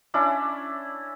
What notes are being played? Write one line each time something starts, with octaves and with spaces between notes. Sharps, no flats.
C#4 D4 E4 B5